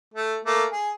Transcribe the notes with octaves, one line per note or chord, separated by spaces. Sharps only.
A3
A3 A#3
G#4